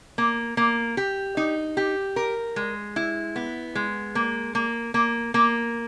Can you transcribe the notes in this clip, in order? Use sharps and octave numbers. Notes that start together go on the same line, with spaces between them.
A#3
A#3
G4
D#4
G4
A#4
G#3
E4
B3
G#3
A#3
A#3
A#3
A#3